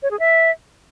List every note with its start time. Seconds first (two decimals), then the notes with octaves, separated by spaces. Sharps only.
0.03 C#5
0.11 G#4
0.19 E5